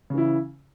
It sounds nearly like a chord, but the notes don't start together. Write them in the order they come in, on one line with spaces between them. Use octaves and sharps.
C#3 E3 E4